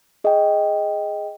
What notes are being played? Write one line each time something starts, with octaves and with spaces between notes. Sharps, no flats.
G#4 D#5 G5